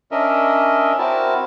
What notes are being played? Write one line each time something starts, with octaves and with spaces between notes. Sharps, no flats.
C#4 D4 A#4 D#5 E5
C4 E4 F#4 A#4 A5